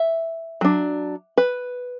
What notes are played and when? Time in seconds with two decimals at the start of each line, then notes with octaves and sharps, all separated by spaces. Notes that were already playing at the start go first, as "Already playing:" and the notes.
Already playing: E5
0.61 F#3 D4
1.38 B4